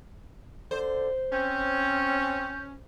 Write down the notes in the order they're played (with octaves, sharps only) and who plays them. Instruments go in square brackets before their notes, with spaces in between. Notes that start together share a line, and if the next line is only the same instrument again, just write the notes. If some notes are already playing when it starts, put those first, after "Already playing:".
[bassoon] D3 [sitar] C5
[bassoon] C4 [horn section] C#4 [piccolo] G6